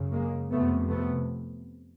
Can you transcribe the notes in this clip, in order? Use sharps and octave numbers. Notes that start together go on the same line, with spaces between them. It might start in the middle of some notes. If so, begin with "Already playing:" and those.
Already playing: F#2 C#3
G#3 A#3
F2 C3 A3 B3
A3 B3